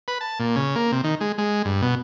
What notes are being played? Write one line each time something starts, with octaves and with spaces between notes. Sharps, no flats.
B4
A5
A#2
C#3
A#3
C3
D#3
G#3
G#3
G2
B2